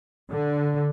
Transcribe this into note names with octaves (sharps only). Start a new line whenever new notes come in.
D3